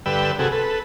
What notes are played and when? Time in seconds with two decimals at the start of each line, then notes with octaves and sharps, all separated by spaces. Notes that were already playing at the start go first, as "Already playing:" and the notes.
0.06 G2 D3 B4 G5 E6
0.39 C3 F#4 G#4 A4
0.52 A4 B4